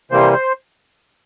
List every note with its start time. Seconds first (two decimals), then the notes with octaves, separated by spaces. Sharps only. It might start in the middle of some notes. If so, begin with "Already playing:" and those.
0.11 C3 E3 G3 A#3 C5
0.33 C5